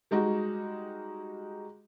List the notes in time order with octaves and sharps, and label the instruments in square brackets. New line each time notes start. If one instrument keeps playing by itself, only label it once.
[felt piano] G3 G#3 D#4 F#4